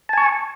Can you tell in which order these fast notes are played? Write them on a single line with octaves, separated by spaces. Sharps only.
A5 G#5 C#6